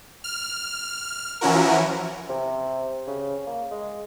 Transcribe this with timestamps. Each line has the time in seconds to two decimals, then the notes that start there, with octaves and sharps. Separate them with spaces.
0.24 F6
1.41 E3 F3 C#4 E4 F#4 A#4
2.29 C3
3.07 C#3
3.47 A#3
3.71 G#3